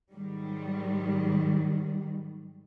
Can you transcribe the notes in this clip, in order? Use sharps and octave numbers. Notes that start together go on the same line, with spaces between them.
G#2 D#3 F#3 G3